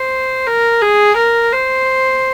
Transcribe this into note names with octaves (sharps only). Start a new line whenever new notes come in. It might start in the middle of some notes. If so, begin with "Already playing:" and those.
Already playing: C5
A#4
G#4
A#4
C5